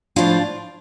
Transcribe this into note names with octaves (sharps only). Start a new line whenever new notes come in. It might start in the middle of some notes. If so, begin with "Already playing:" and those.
A2 F3 D4 F4